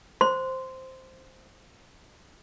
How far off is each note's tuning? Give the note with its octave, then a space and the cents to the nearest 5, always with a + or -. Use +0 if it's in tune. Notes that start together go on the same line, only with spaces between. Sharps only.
C5 +0 C6 -10